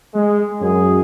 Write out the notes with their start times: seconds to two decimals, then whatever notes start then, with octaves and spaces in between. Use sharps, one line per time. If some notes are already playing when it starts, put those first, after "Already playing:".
0.14 G#3
0.60 F#2 G#4